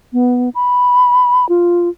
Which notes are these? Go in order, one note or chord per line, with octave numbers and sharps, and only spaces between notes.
B3
B5
F4